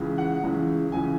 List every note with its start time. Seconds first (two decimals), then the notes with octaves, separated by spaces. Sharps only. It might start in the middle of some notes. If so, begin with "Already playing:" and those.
Already playing: C#2 C#3 E3
0.18 F#5
0.43 C#2 C#3 E3
0.92 C#2 C#3 E3 G#5